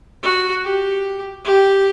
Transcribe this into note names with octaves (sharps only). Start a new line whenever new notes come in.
F#4
G4
G4